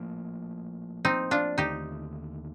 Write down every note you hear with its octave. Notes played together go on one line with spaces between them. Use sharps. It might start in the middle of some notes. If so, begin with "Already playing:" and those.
Already playing: A#1 A2 F3 A#3
C4 D#4
D4 F4
D#2 D3 A3 D#4 G4